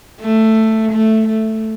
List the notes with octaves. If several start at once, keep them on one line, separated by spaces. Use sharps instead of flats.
A3
A3
A3